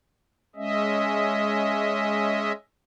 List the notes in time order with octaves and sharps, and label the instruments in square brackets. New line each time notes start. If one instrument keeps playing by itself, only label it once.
[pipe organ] G#3 C#4 D#5 E5